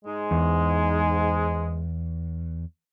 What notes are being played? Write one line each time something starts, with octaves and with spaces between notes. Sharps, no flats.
G#2 G#3
E2